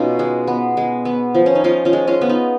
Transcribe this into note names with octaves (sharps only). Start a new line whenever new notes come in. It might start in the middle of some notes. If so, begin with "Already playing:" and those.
Already playing: B2 C#4 D#4 F4
G#3
B3
G#3
B3
F3
C#4
D#4
F3 C#4 F4
C#4 F4
G#3
C#4 F4
B3
D#4